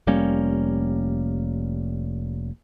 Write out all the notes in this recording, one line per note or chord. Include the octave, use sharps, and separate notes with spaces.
F1 G3 A#3 C#4